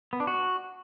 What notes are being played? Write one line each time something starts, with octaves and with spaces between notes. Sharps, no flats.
B3
D4
F#4